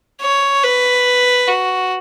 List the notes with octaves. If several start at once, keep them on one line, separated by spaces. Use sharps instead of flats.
C#5
B4
F#4